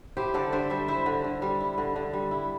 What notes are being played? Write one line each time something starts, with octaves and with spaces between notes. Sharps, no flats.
E4 G4 C5
D3 A4 D5
D3 C5 E5
G3 C5 E5
E4 C5 E5
D3
D3
G3
E4
D3
D3
G3
E4